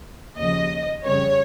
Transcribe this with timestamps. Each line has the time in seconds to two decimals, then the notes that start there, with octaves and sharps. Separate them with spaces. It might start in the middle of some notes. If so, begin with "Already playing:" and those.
0.38 D#2 C#3 F3 D#5
1.05 F2 C#3 G3 C#5